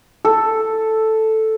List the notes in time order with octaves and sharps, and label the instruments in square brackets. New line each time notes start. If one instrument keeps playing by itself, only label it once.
[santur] A4